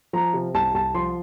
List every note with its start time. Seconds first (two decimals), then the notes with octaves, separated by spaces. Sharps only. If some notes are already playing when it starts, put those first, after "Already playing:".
0.13 F3 A#5
0.33 C3
0.54 C2 A5
0.74 C2 A5
0.95 F3 C6